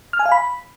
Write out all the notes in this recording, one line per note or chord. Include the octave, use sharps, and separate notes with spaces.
F6
G#5
F5
B5